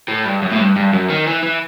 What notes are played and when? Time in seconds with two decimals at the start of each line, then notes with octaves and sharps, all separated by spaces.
0.08 A2
0.26 G2
0.42 F#2
0.52 A2
0.59 G2
0.76 G2
0.93 F#2
1.10 D#3
1.27 E3
1.43 E3